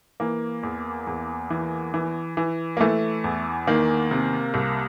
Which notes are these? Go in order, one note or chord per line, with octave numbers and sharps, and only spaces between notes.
E3 A#3
E2
E2
E3
E3
E3
A#3
E3 A3
E2
D#3 A#3
C3
C2